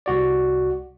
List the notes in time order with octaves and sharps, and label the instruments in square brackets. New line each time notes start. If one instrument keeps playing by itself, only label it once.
[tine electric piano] C2 F#4 D5